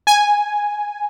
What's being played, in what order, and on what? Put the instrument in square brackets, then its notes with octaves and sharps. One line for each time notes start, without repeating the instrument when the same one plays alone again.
[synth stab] G#5